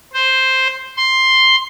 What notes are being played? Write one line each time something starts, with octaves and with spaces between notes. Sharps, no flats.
C5
C6